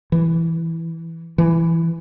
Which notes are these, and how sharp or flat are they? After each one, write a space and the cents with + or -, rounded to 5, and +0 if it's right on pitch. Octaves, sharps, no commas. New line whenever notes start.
E3 +0
E3 +5